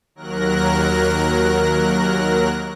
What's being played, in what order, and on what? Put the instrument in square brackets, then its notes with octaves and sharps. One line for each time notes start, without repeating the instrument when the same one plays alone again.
[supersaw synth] D#2 F#3 A#4 F#6 A#6